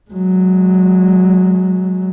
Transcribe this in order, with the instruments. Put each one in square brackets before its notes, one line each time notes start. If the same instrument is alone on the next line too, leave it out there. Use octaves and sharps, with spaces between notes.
[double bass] F#3 G#3